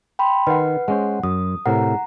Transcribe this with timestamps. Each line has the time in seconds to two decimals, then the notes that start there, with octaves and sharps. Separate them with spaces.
0.19 G5 B5 C6
0.47 D#3 B4 F#5
0.88 G#3 C#4 C5 F#5
1.23 F#2 D#6
1.66 A2 C3 A#4 F#5 A#5